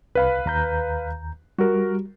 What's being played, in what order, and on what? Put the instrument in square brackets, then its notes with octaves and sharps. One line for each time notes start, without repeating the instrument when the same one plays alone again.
[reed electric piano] C2 [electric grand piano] B4 F5 B5
[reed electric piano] D#2 A#5 G6
[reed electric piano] G3 [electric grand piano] F#4 A#4